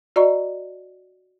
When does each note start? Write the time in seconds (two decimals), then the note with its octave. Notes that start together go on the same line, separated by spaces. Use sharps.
0.16 F#4 D5 D#5 A#5 C#6